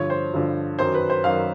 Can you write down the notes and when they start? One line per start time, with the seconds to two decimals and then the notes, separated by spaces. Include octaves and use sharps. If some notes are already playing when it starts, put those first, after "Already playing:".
Already playing: G2 D3 F3 C#5
0.10 C5
0.34 G2 D3 F3
0.79 F#2 D#3 F#3 C5
0.94 B4
1.10 C5
1.24 F#2 D#3 F#3 F5